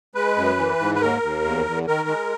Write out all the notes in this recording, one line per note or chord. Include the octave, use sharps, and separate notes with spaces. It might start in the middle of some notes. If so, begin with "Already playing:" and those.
G#3 B4
F#2
E3
G#2
B4
D#2 A#4
D#2
E2
E2
D#3 A#4
G#3